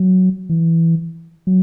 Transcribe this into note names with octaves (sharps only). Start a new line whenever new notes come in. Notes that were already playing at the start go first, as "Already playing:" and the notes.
Already playing: F#3
E3
F#3